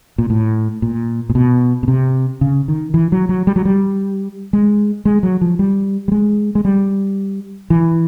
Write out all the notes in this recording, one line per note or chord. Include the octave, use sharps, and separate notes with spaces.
A#2
A2
A#2
A#2
B2
B2
C3
C#3
D#3
E3
F#3
F#3
G3
F#3
G3
G#3
G#3
F#3
F3
G3
G3
G#3
G#3
G3
E3